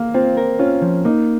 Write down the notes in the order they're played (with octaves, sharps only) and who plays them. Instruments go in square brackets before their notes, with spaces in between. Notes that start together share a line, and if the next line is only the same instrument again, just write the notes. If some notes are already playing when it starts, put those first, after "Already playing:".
Already playing: [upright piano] A#3
[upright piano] C4 [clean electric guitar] F4
[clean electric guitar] A#4
[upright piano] C#4 [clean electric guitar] F4
[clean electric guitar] F3
[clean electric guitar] A#3 [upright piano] D#4